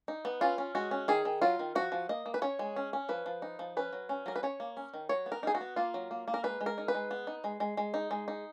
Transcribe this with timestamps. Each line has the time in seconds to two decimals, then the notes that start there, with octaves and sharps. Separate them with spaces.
0.08 D#4
0.25 B3
0.41 C#4 F4
0.58 C#4
0.75 G#3 F#4
0.91 C#4
1.08 D#3 G#4
1.25 D#3
1.41 F#3 F4
1.59 D#3
1.75 F3 F#4
1.92 F3
2.09 A#3 D#5
2.26 A#3
2.34 B4
2.42 C#4 C#5
2.59 G#3
2.76 C#4
2.93 C#4
3.09 F3 B4
3.26 F3
3.42 D#4
3.59 F3
3.77 C#4 B4
3.93 F#3
4.09 C#4
4.26 F#3 A#4
4.36 B4
4.43 C#4 C#5
4.60 A#3
4.77 C#4
4.94 D#3
5.09 F#3 C#5
5.26 B3
5.32 A#4
5.43 D#4 G#4
5.55 F#4
5.61 B3
5.76 A#3 F4
5.94 F#3
6.11 A#3
6.28 A#3
6.34 A#4
6.43 G#3 B4
6.61 G#3
6.66 A#4
6.78 D#4
6.88 B4
6.95 G#3
7.11 B3
7.27 D#4
7.44 G#3
7.60 G#3
7.77 G#3
7.94 D#4
8.11 G#3
8.28 D#4